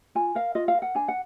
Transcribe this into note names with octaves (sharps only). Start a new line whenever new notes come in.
F4 G#5
A#4 F5
F4 D#5
F5
A#4
F#5
D4 G#5
F#5